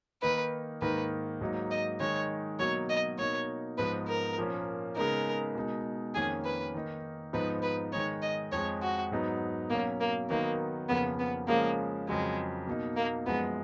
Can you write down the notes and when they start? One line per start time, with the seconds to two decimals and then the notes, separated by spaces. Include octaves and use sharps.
0.22 D#3 A#3 D#4 B4
0.82 G#2 D#3 A#3 D#4 B4
1.41 G#2 F#3 A#3 D#4
1.71 D#5
2.00 D#3 G#3 D#4 C#5
2.59 B2 F#3 A#3 D#4 C#5
2.89 D#5
3.19 B2 A#3 D#4 C#5
3.77 G#2 F3 B3 D#4 B4
4.08 A#4
4.38 A#2 F3 A#3 C#4
4.96 C#3 G#3 B3 D#4 A#4
5.55 B2 G#3 D#4
6.15 F2 D#3 A#3 C#4 G#4
6.45 B4
6.74 D#3 A#3 D#4
7.33 G#2 F3 B3 D#4 B4
7.63 B4
7.93 D#3 G#3 D#4 C#5
8.22 D#5
8.52 F2 F3 G#3 C#5
8.82 F#4
9.12 G#2 F#3 B3 D#4
9.70 B2 F#3 A#3 C#4
10.00 A#3
10.30 D#3 F#3 A#3 B3 D#4
10.89 F2 C#3 F3 A#3 B3
11.19 B3
11.48 C#3 F3 G#3 A#3 C#4
12.08 F2 C#3 F#3 G#3
12.67 B2 A#3 D#4
12.96 A#3
13.26 F#2 F3 G#3 B3